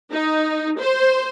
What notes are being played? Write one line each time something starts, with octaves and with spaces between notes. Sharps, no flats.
D#4
C5